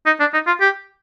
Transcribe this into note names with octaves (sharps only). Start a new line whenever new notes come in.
D#4
D4
D#4
F4
G4